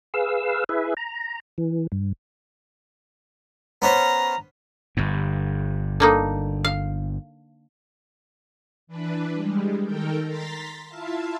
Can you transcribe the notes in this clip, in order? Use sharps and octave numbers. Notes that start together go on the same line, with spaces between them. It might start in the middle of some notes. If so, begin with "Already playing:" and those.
G#4 B4 F5 E6
E4 G#4 B4 E5
A#5
E3
G2
B3 C#4 C5 A#5
G1 G2
D3 A#3 D#4
F5
E3 D4 B4
G3 G#3
D#3 A4 A#4 G5
A#5 C6 A6 B6
E4 F4 E5 F5 A5